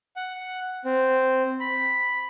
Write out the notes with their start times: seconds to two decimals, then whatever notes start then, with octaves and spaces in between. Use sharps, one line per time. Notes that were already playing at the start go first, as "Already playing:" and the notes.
0.16 F#5
0.85 C4
1.60 B5